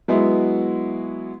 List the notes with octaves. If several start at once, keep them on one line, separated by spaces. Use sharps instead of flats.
F#3 G#3 B3 E4 F#4